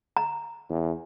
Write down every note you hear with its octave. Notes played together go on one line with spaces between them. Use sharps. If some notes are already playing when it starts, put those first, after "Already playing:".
A#5
E2